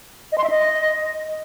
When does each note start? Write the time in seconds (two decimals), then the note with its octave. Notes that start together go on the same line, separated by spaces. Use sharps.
0.32 D#5
0.38 C6
0.44 E5
0.50 D#5